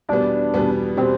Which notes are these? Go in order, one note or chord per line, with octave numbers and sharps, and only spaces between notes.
E2 B2 G3 B3 D4
E2 B2 G3 B3
B2 G3 B3 C4